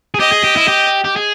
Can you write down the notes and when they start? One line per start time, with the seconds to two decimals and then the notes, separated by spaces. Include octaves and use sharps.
0.14 G#4
0.20 G4 D#5
0.32 G#4
0.44 G4
0.56 E4
0.68 G4
1.04 G4
1.16 G#4